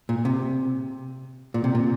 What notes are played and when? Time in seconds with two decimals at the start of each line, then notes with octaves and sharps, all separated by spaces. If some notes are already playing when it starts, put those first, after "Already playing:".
0.09 A#2
0.25 C3
1.54 A#2
1.64 C3
1.75 A#2